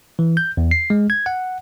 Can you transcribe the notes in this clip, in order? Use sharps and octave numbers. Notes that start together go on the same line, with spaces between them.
E3
G6
E2
C7
G#3
G#6
F#5